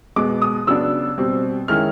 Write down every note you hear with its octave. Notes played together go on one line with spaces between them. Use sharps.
B2 G#3 B3 D6
D#6
C#3 F#3 B3 D4 E6
B2 G3 C4
D#3 G#3 C#4 E4 F6